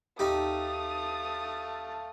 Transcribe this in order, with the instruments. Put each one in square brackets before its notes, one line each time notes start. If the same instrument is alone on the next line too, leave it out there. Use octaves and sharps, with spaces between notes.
[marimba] D#2 [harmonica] A3 F5 A5 [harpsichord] C4 D#4 G4 [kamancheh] D#6